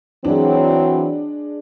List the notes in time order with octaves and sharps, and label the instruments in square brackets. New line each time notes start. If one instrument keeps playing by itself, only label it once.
[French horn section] E3 F#3 C4 [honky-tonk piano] G#3 D4